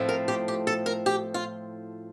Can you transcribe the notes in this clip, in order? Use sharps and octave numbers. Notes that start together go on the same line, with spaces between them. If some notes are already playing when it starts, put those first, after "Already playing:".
Already playing: A2 F3 A3 C4
A#4
G4
G4
A4
A#4
G4
F4